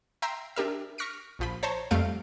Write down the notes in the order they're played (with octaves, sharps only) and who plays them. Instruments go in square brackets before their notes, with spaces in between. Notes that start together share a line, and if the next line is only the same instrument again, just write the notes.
[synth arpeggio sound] E5 G5 A#5 C6
D4 G4 A#4 E5
C#6 F6 A#6 B6 C#7 D7
A#1 F3 B5
C5 C#5 A5 A#5 C6
F2 G3 A3 F5 G6 D7